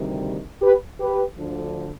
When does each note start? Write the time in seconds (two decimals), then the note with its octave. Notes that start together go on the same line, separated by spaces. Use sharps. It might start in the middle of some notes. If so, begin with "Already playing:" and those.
Already playing: D2 C3 D#3 G3
0.62 G4 B4
1.00 G4 B4
1.38 D2 D3 F3